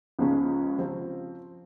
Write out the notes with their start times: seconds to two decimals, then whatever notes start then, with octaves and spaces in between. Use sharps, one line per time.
0.19 C#2 C#3 F3 G#3 C#4
0.79 F3 C4 F4